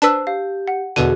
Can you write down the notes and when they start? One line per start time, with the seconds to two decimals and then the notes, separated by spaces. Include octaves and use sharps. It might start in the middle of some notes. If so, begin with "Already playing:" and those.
0.02 D4 B4 C5 A5 E6
0.27 G4 F5
0.68 F#5
0.96 E2 B2 D3 F#4 G#4 D#7